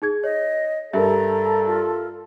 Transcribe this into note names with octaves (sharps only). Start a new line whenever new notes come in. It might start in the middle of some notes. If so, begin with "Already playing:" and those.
D#4 G#4 G#6
C#5 D#5
G2 A4 A#4 E5 A#5
F4